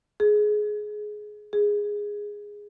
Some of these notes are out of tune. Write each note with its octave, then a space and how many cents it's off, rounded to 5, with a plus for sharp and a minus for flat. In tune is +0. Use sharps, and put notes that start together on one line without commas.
G#4 +15
G#4 -10